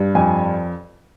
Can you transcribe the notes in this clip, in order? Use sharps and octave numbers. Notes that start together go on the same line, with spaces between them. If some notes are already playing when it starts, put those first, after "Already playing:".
Already playing: G2
F2 G#5